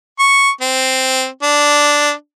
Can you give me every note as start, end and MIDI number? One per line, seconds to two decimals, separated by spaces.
0.19 0.50 85
0.61 1.26 60
1.42 2.12 62